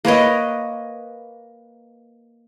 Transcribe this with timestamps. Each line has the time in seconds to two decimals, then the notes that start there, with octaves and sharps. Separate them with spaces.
0.05 A#3 B4 C#5 D#5